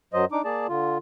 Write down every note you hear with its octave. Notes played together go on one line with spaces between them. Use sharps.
F#2 F#3 C5 D#5
D4 D#4 D6
A#3 G#4 D5 A5
D3 F4